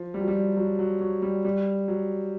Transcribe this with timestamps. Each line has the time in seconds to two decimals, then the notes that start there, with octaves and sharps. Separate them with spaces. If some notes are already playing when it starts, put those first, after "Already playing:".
Already playing: F3
0.14 G3
0.21 F#3
0.28 G3
0.57 F#3
0.79 F#3
1.01 F#3
1.22 G3
1.45 G3
1.88 F#3